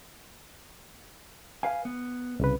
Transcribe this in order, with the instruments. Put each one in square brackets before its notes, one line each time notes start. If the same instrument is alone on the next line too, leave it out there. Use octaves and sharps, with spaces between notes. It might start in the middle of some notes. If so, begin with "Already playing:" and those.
[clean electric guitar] B4 F5 G#5
B3
[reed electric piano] C2 C#3 B4